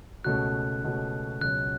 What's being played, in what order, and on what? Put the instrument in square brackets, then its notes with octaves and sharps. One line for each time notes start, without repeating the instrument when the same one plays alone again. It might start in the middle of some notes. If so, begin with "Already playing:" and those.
[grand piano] C#2 B2 A3 C#4 F#4 [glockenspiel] F#6
[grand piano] C#2 B2 A3 C#4 F#4
[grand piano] C#2 B2 F#3 [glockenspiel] F#6